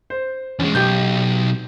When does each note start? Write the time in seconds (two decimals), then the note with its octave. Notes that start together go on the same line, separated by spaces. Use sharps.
0.10 C5
0.59 E2 G#3 C#4
0.75 B1 G4 G6